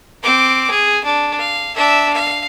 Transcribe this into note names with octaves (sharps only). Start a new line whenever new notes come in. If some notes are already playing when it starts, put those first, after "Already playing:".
C4 D6
G#4
D4
F5
D4 E5
F5